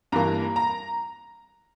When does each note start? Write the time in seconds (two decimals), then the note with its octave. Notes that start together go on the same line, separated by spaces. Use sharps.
0.12 G2 E3 A#3 A#5
0.56 A#5